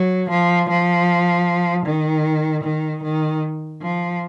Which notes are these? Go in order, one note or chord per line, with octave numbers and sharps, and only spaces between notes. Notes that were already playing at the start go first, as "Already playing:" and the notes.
Already playing: F#3
F3
F3
D#3
D#3
D#3
F3